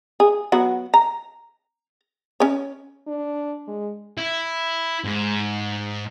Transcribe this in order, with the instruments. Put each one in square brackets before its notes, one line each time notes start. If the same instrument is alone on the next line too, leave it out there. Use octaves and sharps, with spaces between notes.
[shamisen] G#4
F#3 B3 F#4
A#5
C#4 C#5
[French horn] D4
G#3
[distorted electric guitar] E4
G#2